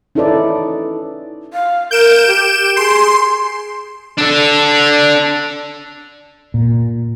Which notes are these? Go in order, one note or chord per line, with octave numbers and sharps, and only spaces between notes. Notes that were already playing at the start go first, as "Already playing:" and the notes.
C#4 D#4 E4 A4 B4 D5
F5
A#4 G6 D7 E7
G4
G#4 C6
D4 A4
A#2